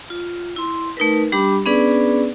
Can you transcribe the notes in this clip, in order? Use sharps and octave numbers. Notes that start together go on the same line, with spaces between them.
F4
E4 C6
A3 D#4 A#4 B4
G3 D4 G4 B5 D6
B3 C#4 D4 G#4 B4 D5